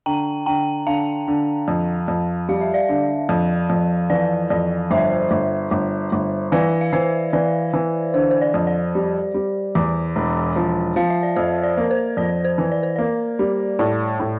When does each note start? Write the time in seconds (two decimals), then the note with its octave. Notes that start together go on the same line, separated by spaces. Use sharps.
0.06 D3 G5 A#5
0.46 D3 G5 A#5
0.87 D3 F5 A5
1.28 D3
1.68 F2
2.08 F2
2.49 G3 F5
2.61 E5
2.74 D5 F5
2.89 D3
3.29 F2
3.70 F2
4.10 E3 D5
4.50 F2 D5
4.91 G1 C5 E5
5.31 G1
5.71 G1
6.12 G1
6.52 E3 D5 F5
6.81 F5
6.92 E3 C5 E5
7.33 E3 D5
7.74 E3
8.14 D3 C5
8.31 C5
8.41 D5
8.54 F2
8.67 D5
8.95 G3
9.34 G3
9.75 E2
10.16 E1
10.56 F3
10.96 F3 F5
11.10 E5
11.23 D5
11.36 F2 C5
11.63 D5
11.77 A#3
11.91 C5
12.17 F2 D5
12.44 C5
12.58 E3
12.72 D5
12.83 C5
12.96 A#3 D5
13.39 G3
13.79 A2 D5
14.20 A2